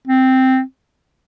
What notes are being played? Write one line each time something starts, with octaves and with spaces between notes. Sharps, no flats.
C4